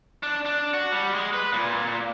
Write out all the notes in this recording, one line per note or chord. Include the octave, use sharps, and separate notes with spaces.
D4
D4
F#4
G3
G#3
B4
A#2